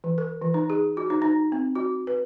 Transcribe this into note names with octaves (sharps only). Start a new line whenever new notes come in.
E3
A#4
E3
D#4
G#4
F#4
D#4
D#4
C4
F#4
B4